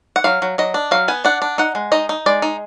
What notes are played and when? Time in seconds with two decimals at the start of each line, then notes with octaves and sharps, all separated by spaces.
0.16 F#5
0.24 F#3 F5
0.42 F#3
0.58 F#3 D#5
0.74 D4
0.91 F#3 F5
1.08 B3 G#5
1.25 D4 F#5
1.42 D4
1.58 D#4 F#5
1.75 G#3
1.92 D#4 D#5
2.09 D#4
2.26 G#3 D5
2.42 D#4